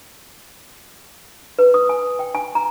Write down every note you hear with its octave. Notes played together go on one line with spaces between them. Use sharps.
B4
D#6
G#5
G5
G#5
A#5